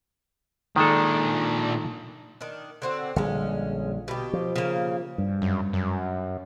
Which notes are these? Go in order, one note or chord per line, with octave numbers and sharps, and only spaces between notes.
A#2 D#3 G#3 D4 A4
D#3 D4
D3 C4 F#4
A#1 D3 G3 G#3 C#4
B2 G4
F3
C#3 A#3
G2
F#2
F#2